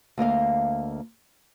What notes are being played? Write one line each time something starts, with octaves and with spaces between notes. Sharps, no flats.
D2 A#3 D#5 F5